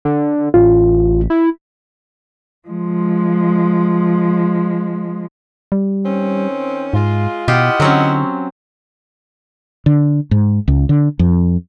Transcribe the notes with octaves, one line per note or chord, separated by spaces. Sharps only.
D3
A1 F4
E4
F3 G#3
G3
D#3 C4 C#4
G#2 G#3 F4
B2 E4 F4 G4 D#5 F#5
D3 F#3 C4 C#4
D3
G#2
C#2
D3
F2